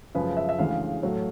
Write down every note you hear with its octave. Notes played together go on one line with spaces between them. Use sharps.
F#2 C#3 F3 G#3 B4
E5
E5
D2 C#3 E3 G#3 F5
A2 F#3 A3